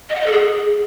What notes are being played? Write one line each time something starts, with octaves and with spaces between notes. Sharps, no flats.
D#5
F#5
D#5
A4
G#4